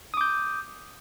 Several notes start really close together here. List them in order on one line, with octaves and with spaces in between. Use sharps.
D#6 D6 G6